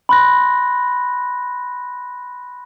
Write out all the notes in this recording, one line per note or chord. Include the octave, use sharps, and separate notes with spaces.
B5 C6 F#6 A#6